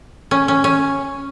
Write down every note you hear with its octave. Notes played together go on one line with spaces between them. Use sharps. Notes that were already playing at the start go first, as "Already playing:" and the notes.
C#4
C#4
C#4